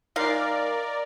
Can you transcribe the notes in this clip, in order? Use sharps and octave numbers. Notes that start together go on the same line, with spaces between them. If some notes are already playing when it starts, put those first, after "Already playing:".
G#3 D#4 A#4 D5 F5